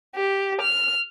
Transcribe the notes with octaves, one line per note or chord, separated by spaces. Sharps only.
G4
F6